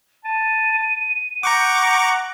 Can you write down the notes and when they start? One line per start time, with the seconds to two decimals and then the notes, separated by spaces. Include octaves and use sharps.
0.25 A5 D#7
1.43 F#5 A#5 C#6 D6 G6